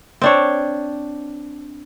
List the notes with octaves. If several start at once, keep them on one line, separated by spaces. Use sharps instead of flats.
C4 D4 C#5